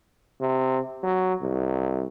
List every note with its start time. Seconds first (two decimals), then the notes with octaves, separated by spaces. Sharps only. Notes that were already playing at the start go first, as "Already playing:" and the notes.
0.40 C3
1.03 F#3
1.42 C2